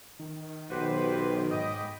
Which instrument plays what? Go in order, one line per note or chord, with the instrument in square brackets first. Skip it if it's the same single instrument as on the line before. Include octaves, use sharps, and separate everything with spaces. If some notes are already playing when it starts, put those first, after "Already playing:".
[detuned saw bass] D#3
[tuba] B1 [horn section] F#4 B4 [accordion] G4 C5
[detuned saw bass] G#2 [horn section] D#5 [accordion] G5 B5 D6